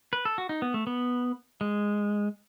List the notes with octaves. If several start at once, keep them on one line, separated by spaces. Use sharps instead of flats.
B4
A4
F#4
D#4
B3
A3
B3
G#3